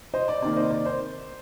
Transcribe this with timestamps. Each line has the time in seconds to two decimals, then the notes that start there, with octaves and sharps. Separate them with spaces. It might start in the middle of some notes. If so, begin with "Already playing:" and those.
0.14 C5 D#5
0.28 D5
0.42 C3 D#3 A#3 D5
0.56 C5 D#5
0.71 D5
0.85 C5